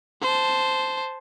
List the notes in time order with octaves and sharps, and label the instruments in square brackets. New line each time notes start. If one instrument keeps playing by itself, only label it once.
[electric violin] C5 A5